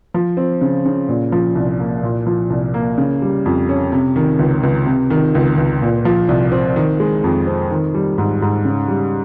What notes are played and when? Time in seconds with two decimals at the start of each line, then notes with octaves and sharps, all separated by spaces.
0.14 F3
0.37 C4
0.61 C#3
0.86 C#3
1.09 A#2
1.32 F3
1.55 C2
1.80 A#3
2.03 A#2
2.27 F3
2.50 C2
2.74 A#3
2.98 C#3
3.22 G3
3.46 F2
3.69 C#4
3.92 C3
4.16 D#3
4.39 C#2
4.63 C#2
4.86 C3
5.10 D#3
5.35 C#2
5.58 C#2
5.82 A#2
6.05 F3
6.29 C2
6.52 C4
6.76 D#3
7.00 G#3
7.24 F2
7.47 C4
7.71 D#3
7.94 G3
8.18 G#2
8.42 G#2
8.65 C#3
8.88 G3